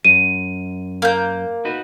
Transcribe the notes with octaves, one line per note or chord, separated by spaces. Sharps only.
F#2 D#7
A#3 G6
D#4 F#4 B4